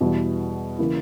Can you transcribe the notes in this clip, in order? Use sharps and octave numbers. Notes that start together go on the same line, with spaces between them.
E2 B2 G3 B3 E4
C#3 E3 A#3 E4